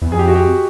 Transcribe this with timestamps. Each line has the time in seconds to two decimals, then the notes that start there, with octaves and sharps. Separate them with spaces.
0.02 E2
0.12 F2 G#4
0.19 G4
0.28 F#4
0.36 G4